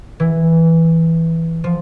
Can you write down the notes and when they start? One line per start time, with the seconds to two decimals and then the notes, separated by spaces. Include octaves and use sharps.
0.20 E3
1.64 F3